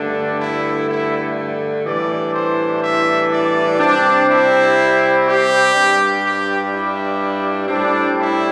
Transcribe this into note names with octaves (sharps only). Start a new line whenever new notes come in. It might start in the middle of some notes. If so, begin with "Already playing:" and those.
Already playing: G2 D3 A3 D4
E4
E4
A2 E3 G3 D4 D5
C5
E5
D5
C3 G3 C4 D4
E4
G4
G2 G3 D4
G4
E4
A2 G3 C4 D4
E4